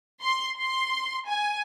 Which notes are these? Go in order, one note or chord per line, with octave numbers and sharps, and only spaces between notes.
C6
C6
G#5